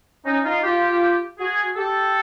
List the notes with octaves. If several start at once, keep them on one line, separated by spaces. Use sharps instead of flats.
C#4 D#4
D#4 F4
F4 G4
F#4 G#4
G4 A4